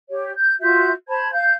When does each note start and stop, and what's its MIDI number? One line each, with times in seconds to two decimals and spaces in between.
0.10 0.31 67
0.10 0.31 73
0.35 0.54 91
0.60 0.91 65
0.60 0.91 66
0.60 0.91 76
0.60 0.91 91
1.08 1.30 72
1.08 1.30 81
1.08 1.30 83
1.08 1.30 92
1.31 1.54 77
1.31 1.54 91